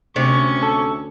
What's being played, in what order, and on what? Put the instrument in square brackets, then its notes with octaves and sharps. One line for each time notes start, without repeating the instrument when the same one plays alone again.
[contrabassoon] D2 [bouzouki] C3 [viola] C#4 C#6
[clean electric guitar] A4